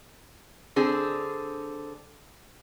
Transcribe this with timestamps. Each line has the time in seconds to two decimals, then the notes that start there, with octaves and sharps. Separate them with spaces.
0.76 D3 C4 G#4